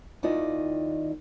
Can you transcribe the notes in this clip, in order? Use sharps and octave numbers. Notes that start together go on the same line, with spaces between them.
D#2 D#3 E4 F4 D5 D#5